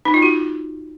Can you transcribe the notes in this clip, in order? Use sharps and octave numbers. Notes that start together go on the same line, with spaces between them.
D#4
F4
F#4